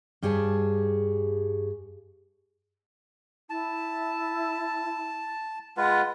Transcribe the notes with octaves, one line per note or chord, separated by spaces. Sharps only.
G2 G4 G#4 C#5 A5
E4 A5
G#3 F4 B4 F#5